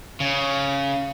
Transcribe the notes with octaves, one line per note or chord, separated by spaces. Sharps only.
C#3